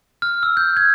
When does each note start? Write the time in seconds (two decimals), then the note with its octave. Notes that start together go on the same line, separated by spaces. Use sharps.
0.22 F6
0.43 E6
0.57 G6
0.77 G#6